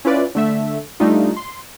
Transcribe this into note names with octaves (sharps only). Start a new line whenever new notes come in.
C#4 E4 F4 B4 D5
D3 A3 E5
G3 A3 D4 D#4 F4
C6